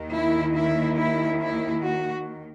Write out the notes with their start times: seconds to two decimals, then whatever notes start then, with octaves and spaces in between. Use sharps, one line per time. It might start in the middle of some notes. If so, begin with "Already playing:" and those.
Already playing: D#2 D#3
0.12 E4
0.55 E4
0.98 E4
1.40 E4
1.83 F#4